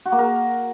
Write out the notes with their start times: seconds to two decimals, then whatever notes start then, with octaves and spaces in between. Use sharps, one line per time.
0.06 F#4
0.12 A#3
0.19 A#4